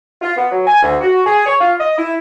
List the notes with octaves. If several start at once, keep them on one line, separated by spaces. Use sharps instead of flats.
F4
B3
F#3
G#5
D2
F#4
G#4
C#5
F4
D#5
E4